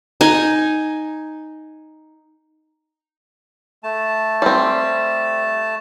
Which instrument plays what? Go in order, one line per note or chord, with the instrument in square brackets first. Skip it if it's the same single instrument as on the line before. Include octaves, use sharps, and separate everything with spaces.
[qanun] D#4 G#5
[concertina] A3 A5
[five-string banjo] G3 C4